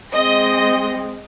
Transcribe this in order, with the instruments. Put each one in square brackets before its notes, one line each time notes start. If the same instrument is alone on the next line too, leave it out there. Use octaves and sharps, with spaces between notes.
[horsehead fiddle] G#3 C4 [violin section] D#5